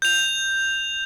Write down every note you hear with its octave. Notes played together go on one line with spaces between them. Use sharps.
G6 F7